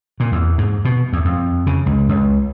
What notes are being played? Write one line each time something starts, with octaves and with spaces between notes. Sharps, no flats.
A#2
E2
G#2
B2
E2
F2
C#3
C#2
C#2